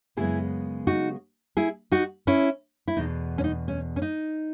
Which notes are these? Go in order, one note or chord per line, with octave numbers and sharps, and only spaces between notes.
F#2 C#3 G#3 B3 E4 G#4
D#4 F#4
E4 G#4
D#4 F#4
C#4 E4
E4
E2 B2 A3 D#4
C#4
D#4
C#4
C#4
D#4